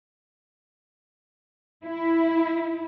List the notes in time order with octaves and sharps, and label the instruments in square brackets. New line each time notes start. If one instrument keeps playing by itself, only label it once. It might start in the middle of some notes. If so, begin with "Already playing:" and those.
[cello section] E4